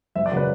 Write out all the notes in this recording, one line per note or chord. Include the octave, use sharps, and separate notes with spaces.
F#1 E5
D5
C#3 F#3 B4